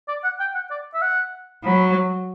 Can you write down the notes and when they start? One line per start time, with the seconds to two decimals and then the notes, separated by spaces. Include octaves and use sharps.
0.08 D5
0.24 F#5
0.40 G5
0.55 F#5
0.71 D5
0.94 E5
1.02 F#5
1.65 F#3 B5